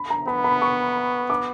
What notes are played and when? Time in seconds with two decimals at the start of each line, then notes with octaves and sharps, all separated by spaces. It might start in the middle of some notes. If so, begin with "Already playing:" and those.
Already playing: B5
0.10 A#5
0.27 B3 B5
0.44 B5
0.62 C#6
1.30 D6